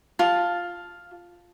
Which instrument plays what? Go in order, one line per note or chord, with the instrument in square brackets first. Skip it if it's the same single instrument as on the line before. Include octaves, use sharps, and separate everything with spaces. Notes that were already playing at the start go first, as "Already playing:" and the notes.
[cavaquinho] F4 A5